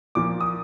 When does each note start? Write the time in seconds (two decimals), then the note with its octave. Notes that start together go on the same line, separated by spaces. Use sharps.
0.15 A#2 F3 D6
0.41 D#6